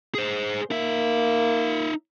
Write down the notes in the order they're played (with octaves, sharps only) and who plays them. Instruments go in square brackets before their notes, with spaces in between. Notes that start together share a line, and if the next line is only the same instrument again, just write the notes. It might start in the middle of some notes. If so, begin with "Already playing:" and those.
[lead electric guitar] G#4 C5
[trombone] A#3 [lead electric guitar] D#4 E5